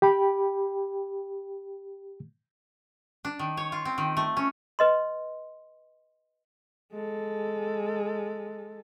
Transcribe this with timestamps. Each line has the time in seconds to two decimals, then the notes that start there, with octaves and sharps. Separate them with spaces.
0.02 G4 G5 B5
3.25 D4
3.39 D#3
3.57 C#5
3.72 F4
3.85 C4
3.98 D#3
4.17 A3
4.37 C#4
4.79 B4 D#5 C6
6.92 G#3 A4